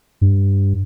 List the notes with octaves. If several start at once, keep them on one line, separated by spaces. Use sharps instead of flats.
G2